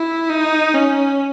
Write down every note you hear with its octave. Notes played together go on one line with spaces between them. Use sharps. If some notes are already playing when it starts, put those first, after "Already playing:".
Already playing: E4
D#4
C#4